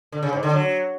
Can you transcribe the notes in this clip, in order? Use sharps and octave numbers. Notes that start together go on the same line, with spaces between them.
D3
C#3
G#2
D3
F#3